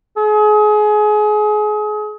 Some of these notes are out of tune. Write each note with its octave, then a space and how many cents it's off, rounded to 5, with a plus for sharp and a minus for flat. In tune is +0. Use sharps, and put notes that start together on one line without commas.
G#4 +30